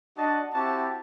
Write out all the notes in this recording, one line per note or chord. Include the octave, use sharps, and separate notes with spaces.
D4 F#4 D#5 F#5 A5
C4 E4 F#4 G4 A5